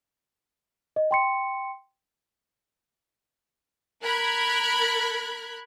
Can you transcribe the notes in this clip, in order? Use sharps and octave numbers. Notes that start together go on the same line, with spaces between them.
D#5
G5 C6 C#7
A#4 B5 F#6 G#6